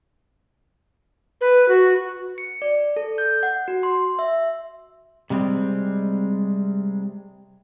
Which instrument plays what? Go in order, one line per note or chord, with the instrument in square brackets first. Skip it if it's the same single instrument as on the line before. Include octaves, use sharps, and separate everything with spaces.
[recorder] B4
F#4
[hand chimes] C#7
D5
A4
G6
F#5
F#4
C6
E5
[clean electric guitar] C3 G3 G#3 C4